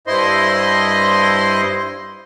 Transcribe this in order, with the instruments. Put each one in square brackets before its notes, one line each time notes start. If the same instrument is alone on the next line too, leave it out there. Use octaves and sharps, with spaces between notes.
[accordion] G2 E4 C5 D#5 C6